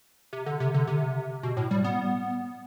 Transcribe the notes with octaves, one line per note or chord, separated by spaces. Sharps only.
C3
D3
C3
D3
C3
B2
A2
G3
B3